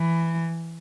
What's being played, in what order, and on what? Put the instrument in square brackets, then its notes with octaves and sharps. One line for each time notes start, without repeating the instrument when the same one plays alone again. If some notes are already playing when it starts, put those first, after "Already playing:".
Already playing: [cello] E3